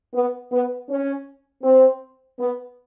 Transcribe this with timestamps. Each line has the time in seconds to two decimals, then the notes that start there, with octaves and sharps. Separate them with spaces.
0.14 B3
0.52 B3
0.90 C#4
1.63 C4
2.39 B3